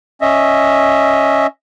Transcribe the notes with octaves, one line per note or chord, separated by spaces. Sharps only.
C#4 D#5 E5